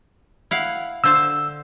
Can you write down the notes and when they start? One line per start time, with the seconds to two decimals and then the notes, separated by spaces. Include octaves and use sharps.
0.51 E4 F5 F#5
1.04 D3 C5 A5 E6